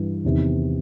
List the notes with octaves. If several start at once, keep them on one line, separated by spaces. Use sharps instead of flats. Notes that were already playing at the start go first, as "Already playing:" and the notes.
Already playing: G2 E3
E2 C3 D#3